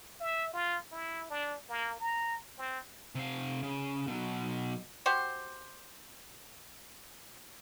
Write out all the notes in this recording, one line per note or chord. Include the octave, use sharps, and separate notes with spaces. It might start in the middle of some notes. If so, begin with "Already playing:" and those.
E5
F4
E4
D4
A#3
A#5
C4
C3 F5
C#3
B2 F#3
F#4 G4 C5